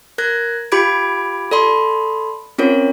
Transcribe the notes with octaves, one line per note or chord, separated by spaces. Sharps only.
A#4 F#6 G#6 A#6
F4 G4 B5 D6 G#6 D7
A4 D5 B5 C6
C4 C#4 F4 A#4 C#5